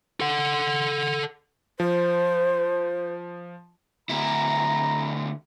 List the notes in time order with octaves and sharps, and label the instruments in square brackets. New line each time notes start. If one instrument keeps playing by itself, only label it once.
[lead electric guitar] A4 F#5
[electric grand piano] F3 [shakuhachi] C5
[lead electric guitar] D2 E4 [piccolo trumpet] A#5